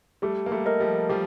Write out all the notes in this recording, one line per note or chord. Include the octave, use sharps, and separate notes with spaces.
G3 A3 G4
A#3
G3 A3
A#4 D#5
F3 G3
F3 G3 G4